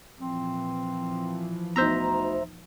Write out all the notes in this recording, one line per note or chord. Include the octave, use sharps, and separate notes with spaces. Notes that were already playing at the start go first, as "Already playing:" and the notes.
A#2 E3 F3 C4
D2 B3 D#4 C5 E5 A#5